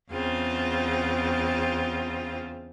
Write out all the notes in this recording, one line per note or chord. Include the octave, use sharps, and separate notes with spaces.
E2 C#3 C4 F4